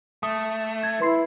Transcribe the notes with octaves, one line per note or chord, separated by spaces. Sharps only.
A3 D#6
G#6
E4 B4 C6 C7